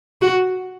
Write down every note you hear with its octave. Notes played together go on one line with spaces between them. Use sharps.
F#4